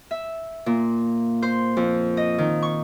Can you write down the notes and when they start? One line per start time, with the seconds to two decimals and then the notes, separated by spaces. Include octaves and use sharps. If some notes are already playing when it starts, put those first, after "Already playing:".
0.11 E5
0.66 A#2
1.42 C5
1.77 F2
2.17 D#5
2.38 D#3
2.62 C#6